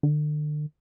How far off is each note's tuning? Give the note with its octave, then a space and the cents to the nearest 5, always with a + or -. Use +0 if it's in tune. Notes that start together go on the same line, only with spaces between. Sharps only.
D3 +40